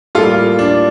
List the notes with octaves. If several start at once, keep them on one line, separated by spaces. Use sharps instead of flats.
A2 G3 A#3 F4 A4
D4